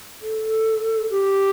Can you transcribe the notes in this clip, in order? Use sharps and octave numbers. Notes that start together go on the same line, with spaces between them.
A4
G4